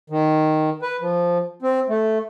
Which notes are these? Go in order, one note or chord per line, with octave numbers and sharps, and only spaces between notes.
D#3
B4
F3
C4
A3